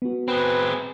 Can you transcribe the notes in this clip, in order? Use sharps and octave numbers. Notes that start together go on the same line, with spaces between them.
B3 F#4
C4 G#4 B4